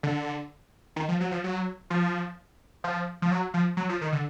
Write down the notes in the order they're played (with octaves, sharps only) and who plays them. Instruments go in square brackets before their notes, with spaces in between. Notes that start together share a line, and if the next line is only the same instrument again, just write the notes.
[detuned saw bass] D3
D#3
F3
F#3
F3
F#3
F3
F3
F3
F#3
F3
F#3
F3
D#3
D3